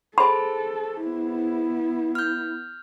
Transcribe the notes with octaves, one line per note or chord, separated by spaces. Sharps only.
G#4 A4 C5 B5
B3 E4
F6 G6